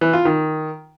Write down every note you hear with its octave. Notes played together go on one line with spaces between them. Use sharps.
E3
F4
D#3